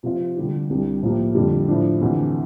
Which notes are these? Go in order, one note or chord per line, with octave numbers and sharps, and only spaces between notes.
C3 F3 C4 F4
D3 G3 D4 G4
C2 C3 G3 D4
A2 F3 A#3 E4 G4
F2 D3 G3
A2 F3 A3 D4
D2 C3 E3 A3